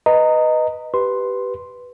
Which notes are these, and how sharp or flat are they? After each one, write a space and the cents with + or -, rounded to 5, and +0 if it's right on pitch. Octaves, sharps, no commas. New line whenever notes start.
B4 +0 D#5 +0 A#5 -20
G4 -15 B4 +0 C6 +0